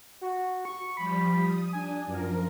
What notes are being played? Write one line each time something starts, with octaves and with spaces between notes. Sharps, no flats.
F#4
C#6
F3 G3 B5
D#6
D4 G#5
F#2 F3 A#4